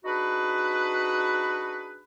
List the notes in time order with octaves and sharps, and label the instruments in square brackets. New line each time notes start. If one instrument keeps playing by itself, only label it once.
[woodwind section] D4 D#4 F#4 G#4 B4